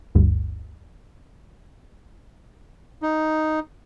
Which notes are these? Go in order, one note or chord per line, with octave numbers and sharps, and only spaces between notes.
G1 D2 G2
D#4